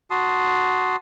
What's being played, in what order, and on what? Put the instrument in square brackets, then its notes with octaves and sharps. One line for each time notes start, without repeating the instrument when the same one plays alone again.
[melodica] F#4 A5 C6 D#6